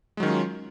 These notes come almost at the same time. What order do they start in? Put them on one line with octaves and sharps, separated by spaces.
G#3 F#3 D#3 C#4 F4